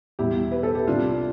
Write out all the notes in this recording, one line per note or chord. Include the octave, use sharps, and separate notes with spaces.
E2 B2 G3 E4 G4
B4
A4
G4
C2 C3 G3 D4 F4